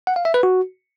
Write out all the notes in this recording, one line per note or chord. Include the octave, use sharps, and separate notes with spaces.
F#5
F5
E5
B4
F#4